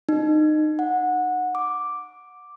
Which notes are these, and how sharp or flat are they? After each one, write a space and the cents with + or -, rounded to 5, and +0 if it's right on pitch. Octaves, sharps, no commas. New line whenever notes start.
D#4 -25
F#5 -20
D6 +0